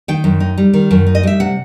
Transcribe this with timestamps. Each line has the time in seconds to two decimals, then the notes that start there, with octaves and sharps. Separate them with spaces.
0.08 D#3 G5
0.24 F#2
0.40 D#4
0.58 G3
0.73 D#3
0.91 F#2
1.07 D#4
1.15 D#5
1.23 G3 E5
1.40 C3 F#5